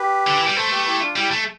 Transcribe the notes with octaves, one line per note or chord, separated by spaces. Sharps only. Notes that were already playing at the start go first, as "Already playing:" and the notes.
Already playing: G4 B4
D3
E3
G3 B4
A3 A4 C5
G4 B4
E4 G4
D4 F4
G3 E4 G4
A3